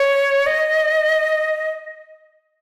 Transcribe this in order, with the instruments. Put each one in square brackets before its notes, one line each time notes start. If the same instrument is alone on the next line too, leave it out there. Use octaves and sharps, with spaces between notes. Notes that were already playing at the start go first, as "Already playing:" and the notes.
Already playing: [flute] C#5
D#5